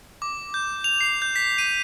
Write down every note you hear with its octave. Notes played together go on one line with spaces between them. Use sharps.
D6
G6
F7
C7
G6
B6
D#7